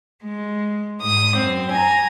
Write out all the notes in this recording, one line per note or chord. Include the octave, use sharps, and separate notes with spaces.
G#3
G#2 D#6
F#2 C4
G#5 A#5